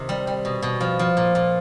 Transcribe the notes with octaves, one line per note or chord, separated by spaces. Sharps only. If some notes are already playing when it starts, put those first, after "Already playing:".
Already playing: C3 D#3
G3
G3
B2
B2
F3
F3
A#2
A#2